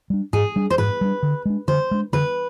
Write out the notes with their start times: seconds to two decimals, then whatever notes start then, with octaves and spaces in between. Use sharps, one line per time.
0.10 G3 D4
0.33 G#2 G#4
0.56 G3 D4
0.70 C5
0.78 G#2 B4
1.01 G3 D4
1.23 D3
1.45 G#3 D4
1.68 D3 C5
1.91 G#3 D4
2.13 D3 B4